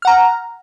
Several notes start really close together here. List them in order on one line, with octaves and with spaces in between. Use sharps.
F6 F#5 A#5